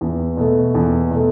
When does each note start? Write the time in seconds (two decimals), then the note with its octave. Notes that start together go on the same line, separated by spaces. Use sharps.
0.01 E2
0.37 B2 A3
0.75 E2
1.11 B2 A3